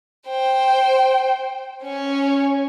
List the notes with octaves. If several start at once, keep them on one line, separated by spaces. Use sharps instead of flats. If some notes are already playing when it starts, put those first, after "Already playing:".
C5 G5
C#4 C#5